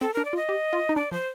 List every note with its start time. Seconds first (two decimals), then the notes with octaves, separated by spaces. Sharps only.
0.01 C4 A4
0.14 D4 A#4
0.25 D5
0.33 F4
0.37 D#5
0.49 G4
0.73 F4
0.89 D#4
0.96 D4 D5
1.11 F3 C5